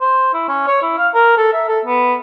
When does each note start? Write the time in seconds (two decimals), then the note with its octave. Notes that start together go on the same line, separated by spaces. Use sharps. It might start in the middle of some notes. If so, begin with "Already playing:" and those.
0.01 C5
0.34 E4
0.48 C#4
0.67 C#5
0.82 E4
0.98 F5
1.14 A#4
1.37 A4
1.53 E5
1.68 A4
1.85 B3